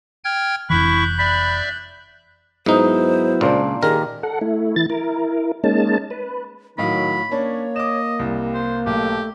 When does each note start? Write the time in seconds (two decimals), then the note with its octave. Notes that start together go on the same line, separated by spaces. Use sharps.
0.24 G5 F6 G#6
0.70 F1 E3 E4 B5 C#6 F#6 G6
1.19 D5 E5 B5
2.66 G#2 F#3 B3 D#4 E4 C5
3.41 C#2 A#2 A#3 D4
3.83 D#3 G4 G#4 A#4
4.23 A4 F#5
4.41 A3 E4
4.76 E3 E4 A6
4.90 E4 A#4
5.64 G#3 A#3 C#4 D#4 A5
6.11 B4
6.78 A2 D#3 F#3 D#5 F5 B5
7.31 A#3 C#4 D4 C#5
7.76 D#5 D6 E7
8.19 C2 G3
8.54 C5
8.86 B1 A3 G4